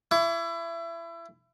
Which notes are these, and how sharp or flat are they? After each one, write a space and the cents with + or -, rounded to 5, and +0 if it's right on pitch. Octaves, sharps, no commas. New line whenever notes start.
E4 +25 D6 -45